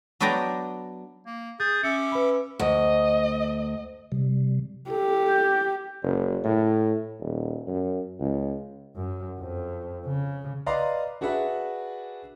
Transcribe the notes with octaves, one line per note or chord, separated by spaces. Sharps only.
F#3 B3 D4 D5 G5 A#5
A#3
G#4 G6 A6
C#4 E5 D6 C#7
B4 B5
D2 D#5
C3 G3
G4 A4
G6
F#1
A2
D#1
F#2
C#2
F#2
F2
C#3
B4 D5 D#5 F5 A#5 C6
D4 F#4 G#4 B4 E5